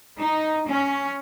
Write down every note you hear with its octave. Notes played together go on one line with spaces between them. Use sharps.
D#4
C#4